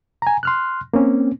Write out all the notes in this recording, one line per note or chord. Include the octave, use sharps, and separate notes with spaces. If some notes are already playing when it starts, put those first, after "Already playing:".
G#5 A#5
C6 F6 F#6
A#3 C4 C#4